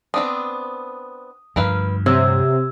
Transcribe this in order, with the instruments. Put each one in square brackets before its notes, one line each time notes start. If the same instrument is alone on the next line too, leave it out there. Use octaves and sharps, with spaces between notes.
[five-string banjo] B3 C4 D4 [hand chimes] D#6
[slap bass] D2 G2 F3 [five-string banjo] A#4 B4 F5
[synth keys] C3 [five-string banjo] F#3 [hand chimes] E6 G#6